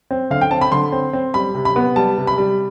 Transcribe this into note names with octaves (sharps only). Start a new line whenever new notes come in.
C4
D3 F5
G5
C4 A5
B5
D3 C6
C4
C4
G3 B5
C3
B5
B3
G3 A5
C3
B5
G3